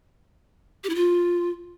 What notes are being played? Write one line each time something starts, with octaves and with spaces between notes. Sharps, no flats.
G4
E4
F4